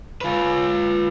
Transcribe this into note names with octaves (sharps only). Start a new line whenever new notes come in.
F4 B4